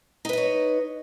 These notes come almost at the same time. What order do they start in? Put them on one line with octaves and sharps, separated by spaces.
D#4 B4 D#5 C#5